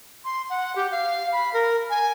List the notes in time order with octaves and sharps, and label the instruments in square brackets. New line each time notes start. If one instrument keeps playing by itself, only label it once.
[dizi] C6
F#5
G4
F5
B5
A#4
G#5